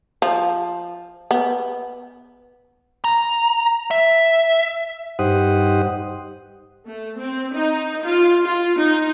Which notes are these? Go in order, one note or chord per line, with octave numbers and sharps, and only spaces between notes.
F3
B3
A#5
E5
G2 D#4 G4 C5 F#5 D#6
A3
C4
D#4
F4
F4
D#4